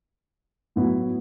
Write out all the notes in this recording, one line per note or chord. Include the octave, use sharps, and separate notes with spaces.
A2 F#3 B3 E4